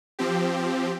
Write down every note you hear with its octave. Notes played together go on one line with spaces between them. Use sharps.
F3 C4 G4